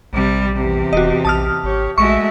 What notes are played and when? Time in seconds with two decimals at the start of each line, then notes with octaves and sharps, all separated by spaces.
0.13 A#1 C3 G3
0.56 E2 C3 G4
0.93 E1 F#4 D#5
1.25 A#1 A5 D#6 F6
1.64 G#1 G4 C#5
1.98 A#1 G#3 A3 F#4 E5 C#6